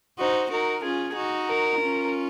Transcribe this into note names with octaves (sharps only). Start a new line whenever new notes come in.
D#4 F#4 C5
D#4 F#4 A#4
C#4 F4 G#4
D#4 F#4
A#4
C#4 F4